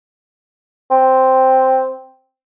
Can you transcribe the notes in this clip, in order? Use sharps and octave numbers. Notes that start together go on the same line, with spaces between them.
C4